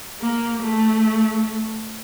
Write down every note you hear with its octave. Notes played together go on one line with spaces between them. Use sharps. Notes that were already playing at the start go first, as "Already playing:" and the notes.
A#3
A3